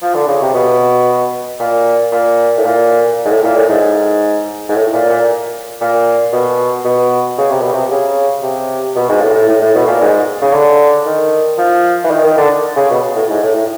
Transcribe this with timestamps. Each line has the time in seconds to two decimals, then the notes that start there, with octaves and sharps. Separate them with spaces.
0.02 F3
0.14 D3
0.27 C#3
0.41 C3
0.54 B2
1.60 A#2
2.12 A#2
2.57 A2
2.65 A#2
3.25 G#2
3.30 A2
3.44 A#2
3.56 A2
3.69 G#2
4.69 G#2
4.75 A2
4.93 A#2
5.10 A#2
5.81 A#2
6.33 B2
6.85 B2
7.38 C#3
7.50 C3
7.61 B2
7.73 C3
7.90 C#3
8.43 C3
8.96 B2
9.09 G#2
9.21 A2
9.35 A2
9.49 A2
9.61 A2
9.75 B2
9.87 A#2
10.01 G#2
10.42 C#3
10.53 D3
11.06 D#3
11.58 F3
12.04 E3
12.11 D#3
12.24 D#3
12.38 D3
12.76 C#3
12.90 B2
13.16 A2
13.30 G#2
13.43 A2
13.56 A2